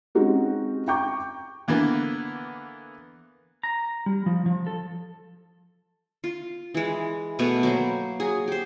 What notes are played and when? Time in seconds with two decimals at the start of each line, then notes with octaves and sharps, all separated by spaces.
0.15 G#3 C4 C#4 D#4 F#4 G4
0.88 G5 A#5 C#6 D6 G6
1.68 D3 E3 A#3 B3
3.63 A#5
4.06 G3
4.26 F3
4.46 F3
4.67 A4
6.24 F4
6.74 E3 G#3
7.39 B2 A3 B3 G#5
7.63 F#3 A#3 C5
8.20 F#3 G#4
8.48 G4 C5